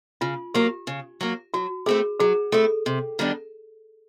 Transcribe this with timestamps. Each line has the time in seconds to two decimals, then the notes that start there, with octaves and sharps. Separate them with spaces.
0.21 C#3 F4
0.54 F#3 A#3 G4
0.87 C#3
1.21 F#3 A#3
1.54 F#3 F#4
1.86 A3 C4 E4 G#4
2.20 F#3 G#4
2.52 A3 C4 E4 A4
2.86 C3
3.19 D#3 G3 B3 D4